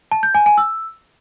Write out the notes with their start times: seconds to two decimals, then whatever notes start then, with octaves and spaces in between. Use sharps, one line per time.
0.11 A5
0.23 G6
0.35 G#5
0.46 G#5
0.58 E6